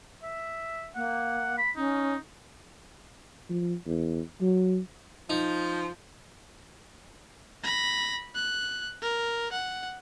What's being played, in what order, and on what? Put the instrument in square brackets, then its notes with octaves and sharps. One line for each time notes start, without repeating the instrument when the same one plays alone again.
[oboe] E5
[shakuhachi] A#3 [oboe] F#5
[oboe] B5
[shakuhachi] C#4 [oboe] D#4
[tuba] F3
E2
F#3
[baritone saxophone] F3 [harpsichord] D#4
[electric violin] B5 A#6
F#6
A#4
F#5